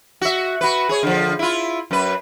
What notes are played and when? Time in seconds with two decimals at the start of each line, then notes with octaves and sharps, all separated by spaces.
0.21 F#4 E5
0.61 F#4 B4
0.89 G#4 C#5
1.03 D3 F3
1.39 E4 F4
1.91 F#2 B4